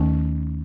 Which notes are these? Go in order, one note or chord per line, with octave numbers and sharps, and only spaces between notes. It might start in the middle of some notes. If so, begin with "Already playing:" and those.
Already playing: D#2 D#3 A3 C#4